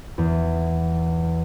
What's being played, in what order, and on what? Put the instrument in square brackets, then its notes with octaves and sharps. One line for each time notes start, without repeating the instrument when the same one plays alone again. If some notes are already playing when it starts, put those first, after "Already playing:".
[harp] E2